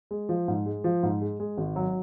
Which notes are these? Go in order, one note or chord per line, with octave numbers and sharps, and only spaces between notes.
G#3
F3
G#2
G#3
F3
G#2
G#3
G#3
G#1
F#3